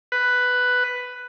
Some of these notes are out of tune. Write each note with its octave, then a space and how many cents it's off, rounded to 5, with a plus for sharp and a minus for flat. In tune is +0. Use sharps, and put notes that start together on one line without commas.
B4 +5